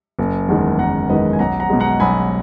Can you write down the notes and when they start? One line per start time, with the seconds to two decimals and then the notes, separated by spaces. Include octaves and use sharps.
0.19 F#1
0.48 E2 D#3 G#3
0.79 F#1 F#5 A#5
1.09 E2 D#3 G#3 B4 D#5
1.33 G#5
1.39 B1 F#5 A#5
1.60 F#5 A#5
1.70 B2 G#3
1.80 F#5 A#5
2.00 B1 G#5 B5